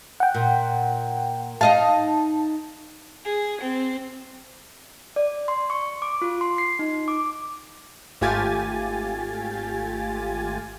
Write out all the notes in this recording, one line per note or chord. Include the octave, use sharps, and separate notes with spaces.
F#5 G5
A#2
D#4 D#5 F5 A5
G#4
C4
D5
C6
C#6
D6
F4
C6
C7
D#4
D6
G#1 A3 F4 G4 G#5 A6